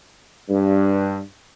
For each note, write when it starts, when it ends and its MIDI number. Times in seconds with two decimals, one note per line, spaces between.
0.49 1.21 43